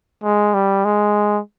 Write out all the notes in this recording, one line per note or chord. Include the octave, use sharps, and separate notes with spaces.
G#3
G3
G#3